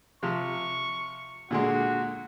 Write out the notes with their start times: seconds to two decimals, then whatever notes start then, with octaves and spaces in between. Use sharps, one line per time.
0.23 C3 F3 C#6
1.51 A#2 D3 G#3 F#4